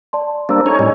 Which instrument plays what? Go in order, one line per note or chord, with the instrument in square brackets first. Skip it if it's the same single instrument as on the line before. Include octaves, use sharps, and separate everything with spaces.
[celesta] D5 A5 C6
[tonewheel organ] G3 A#3 D4 [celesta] C5 A#5 E6
[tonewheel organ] C#4 D#4 C#5 [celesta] A4 A#5 C#6
[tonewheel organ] A2 G3 C#4 [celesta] D#5